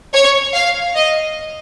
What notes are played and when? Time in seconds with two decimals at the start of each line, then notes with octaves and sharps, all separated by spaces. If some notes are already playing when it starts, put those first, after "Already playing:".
0.13 C#5
0.54 F5
0.94 D#5